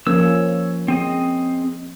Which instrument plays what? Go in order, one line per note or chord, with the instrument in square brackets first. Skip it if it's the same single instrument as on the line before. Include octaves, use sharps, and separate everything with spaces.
[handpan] F3 A#3 C#4 [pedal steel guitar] C#5 E6
[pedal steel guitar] C4 G#4 D#5